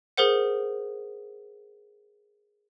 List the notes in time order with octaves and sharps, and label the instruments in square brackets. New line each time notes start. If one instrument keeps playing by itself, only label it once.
[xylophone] G#4 A#4 C5 F#5